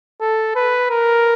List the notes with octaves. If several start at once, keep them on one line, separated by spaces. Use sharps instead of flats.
A4
B4
A#4